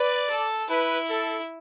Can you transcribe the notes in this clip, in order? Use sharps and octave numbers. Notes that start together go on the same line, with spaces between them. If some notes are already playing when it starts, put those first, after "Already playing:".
Already playing: B4 D5
A4
E4 B4
A4